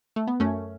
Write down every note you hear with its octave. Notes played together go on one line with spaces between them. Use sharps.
A3
B3
F#2 A3 C#4